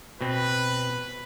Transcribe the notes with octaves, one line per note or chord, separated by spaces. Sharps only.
B2 C4 B4